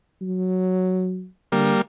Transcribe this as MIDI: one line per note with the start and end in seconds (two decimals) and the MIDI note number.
0.22 1.27 54
1.52 1.74 50
1.52 1.82 55
1.52 1.82 58